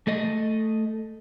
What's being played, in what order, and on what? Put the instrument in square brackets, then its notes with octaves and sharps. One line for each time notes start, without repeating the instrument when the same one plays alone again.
[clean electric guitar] A3 A4 D#5